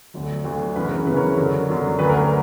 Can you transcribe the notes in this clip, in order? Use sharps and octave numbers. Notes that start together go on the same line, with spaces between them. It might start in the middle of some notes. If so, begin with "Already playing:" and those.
D2 D3 F#3
D2 D3 F#3
F#2 C#3 E3 B4
A#4
F#2 C#3 E3 B4
A#4 C#5
F#2 D3 F#3 A#4
F#2 D3 F#3
D2 D3 F#3 B4
A#4
A#4